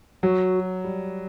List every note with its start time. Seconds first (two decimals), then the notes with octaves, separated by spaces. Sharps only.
0.23 F#3 F#4
0.84 G3